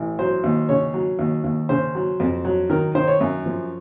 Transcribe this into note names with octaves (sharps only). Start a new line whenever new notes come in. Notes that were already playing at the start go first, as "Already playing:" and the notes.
Already playing: A1
F#3 C5
D#2
C#3 C#5
F#3
D#2
D#2
C#3 C5
F#3
F2
F#3
D#3 A#4
D#3 C5
C#5
F#2
F3